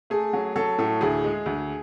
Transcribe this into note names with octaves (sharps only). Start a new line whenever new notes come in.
A3 G#4
F#3
F#3 A4
A2 A4
D2 G#4
G#3
D2